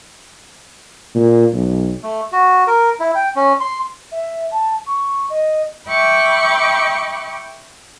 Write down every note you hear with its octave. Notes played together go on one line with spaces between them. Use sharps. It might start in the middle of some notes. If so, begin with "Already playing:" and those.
A#2
B1
A3
F#4
A#4
E4
G5
C#4
C6
E5
A5
C#6
D#5
E5 G5 B5 C#6 D6